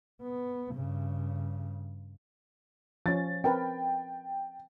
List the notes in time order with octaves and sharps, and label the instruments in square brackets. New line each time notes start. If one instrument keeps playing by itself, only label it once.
[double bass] B3
G2 C#3
[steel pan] F3 C#4 [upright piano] A6
[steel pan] C4 A#4 B4 [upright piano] G5